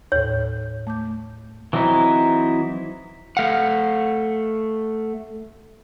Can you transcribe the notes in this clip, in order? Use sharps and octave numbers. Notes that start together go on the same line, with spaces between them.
D#2 A2 C#5
A3 D6 G6
E3 F#3 C4 D#4 E4
A3 F5 F#5